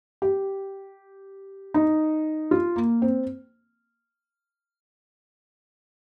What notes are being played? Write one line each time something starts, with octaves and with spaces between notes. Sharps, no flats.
G4
D#4
F4
A#3
C4